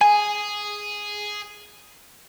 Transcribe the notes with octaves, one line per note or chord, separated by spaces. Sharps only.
G#4 G#5